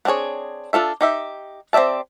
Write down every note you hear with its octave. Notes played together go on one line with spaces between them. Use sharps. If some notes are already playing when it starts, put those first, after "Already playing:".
B3 C4 D4 G#4 C#5
D4 F4 A4 E5
D#4 G4 E5
C4 G4 D5 E5 A5